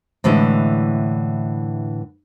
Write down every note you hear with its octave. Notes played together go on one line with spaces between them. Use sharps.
A2 D3 E3 G#3